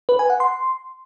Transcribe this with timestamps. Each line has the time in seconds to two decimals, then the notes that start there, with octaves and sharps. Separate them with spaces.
0.09 B4
0.19 G#5
0.30 F#5
0.40 C6